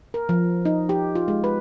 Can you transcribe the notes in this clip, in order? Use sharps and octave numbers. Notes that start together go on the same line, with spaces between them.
A#4
F3
D#4
G4
F4
G#3
B4